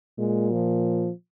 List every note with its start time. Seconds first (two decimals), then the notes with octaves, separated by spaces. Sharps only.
0.19 A#2 G#3
0.51 F3